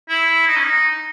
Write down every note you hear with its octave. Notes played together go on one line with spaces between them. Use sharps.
E4
D#4
C#4
D#4